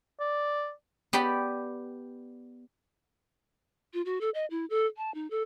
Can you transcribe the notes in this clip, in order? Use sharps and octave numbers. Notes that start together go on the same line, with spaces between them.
D5
B3 G4 D5 G5 B5
F4
F#4
A4
D#5
E4
A4
A5
D#4
A4